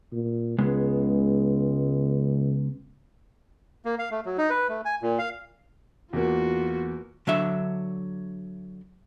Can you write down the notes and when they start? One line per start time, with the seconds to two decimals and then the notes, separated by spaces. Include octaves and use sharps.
0.13 A#2
0.58 C#2 C#3 G#3 B3
3.85 A#3
3.99 F5
4.11 A3
4.26 F#3
4.38 D#4
4.50 B4
4.69 A3
4.85 G#5
5.02 A#2
5.19 F5
6.13 E2 A#3 F4 F#4
7.27 D3 F#3 D4 E5